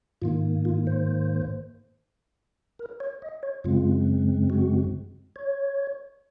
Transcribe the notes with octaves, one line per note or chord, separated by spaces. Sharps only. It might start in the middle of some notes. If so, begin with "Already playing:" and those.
G#2 D#3 A#3 F4
F4
C5
A#4
C#5
D#5
C#5
F#2 C#3 G#3 C4 F4
F#4
C#5